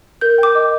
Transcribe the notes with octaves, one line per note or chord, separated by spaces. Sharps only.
A#4 G6
G5 D6
D#5